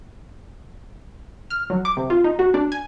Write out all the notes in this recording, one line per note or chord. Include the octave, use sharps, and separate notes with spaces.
F6
F#3
D6
C3
F4
D#4
F#4
D4
G#5